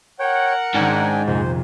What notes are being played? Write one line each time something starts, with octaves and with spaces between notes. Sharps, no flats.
A#4 C#5 F#5 G5
G#2 D#3 C#4 D4 G5 G#5
A#1 F2 C3 C5